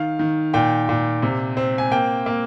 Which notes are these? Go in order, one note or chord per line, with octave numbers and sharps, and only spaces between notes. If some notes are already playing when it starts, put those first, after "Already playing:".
Already playing: D#3 F5
D#3
A#2 G5
A#2
C3
C4
G#5
A#3 G5
A#3